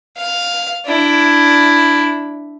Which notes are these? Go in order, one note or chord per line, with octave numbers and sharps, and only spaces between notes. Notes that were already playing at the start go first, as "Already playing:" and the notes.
F5
D4 E4